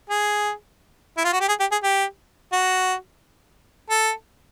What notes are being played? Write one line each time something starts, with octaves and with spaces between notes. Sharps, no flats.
G#4
E4
F4
F#4
G4
G#4
G4
G#4
G4
F#4
A4